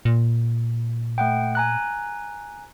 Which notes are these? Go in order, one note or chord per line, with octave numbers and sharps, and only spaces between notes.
A#2
A3 F#5 G5
G#5 A#5 F#6